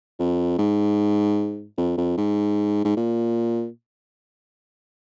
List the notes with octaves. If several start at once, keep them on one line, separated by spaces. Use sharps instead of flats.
F2
G#2
F2
F2
G#2
G#2
A#2